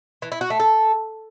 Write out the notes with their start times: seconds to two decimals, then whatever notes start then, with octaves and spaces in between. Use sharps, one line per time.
0.22 E3
0.32 E4
0.41 F#4
0.50 A3
0.60 A4